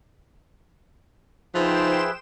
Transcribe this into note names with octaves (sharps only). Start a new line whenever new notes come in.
F3 D#4 G#4 B4 C5 E5 G5 E7